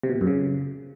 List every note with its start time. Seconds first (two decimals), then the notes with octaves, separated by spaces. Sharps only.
0.03 C3
0.09 B2
0.15 A#2
0.21 F#2
0.27 C#3